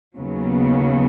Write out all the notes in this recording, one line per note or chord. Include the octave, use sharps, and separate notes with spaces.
D#2 C#3 F#3 B3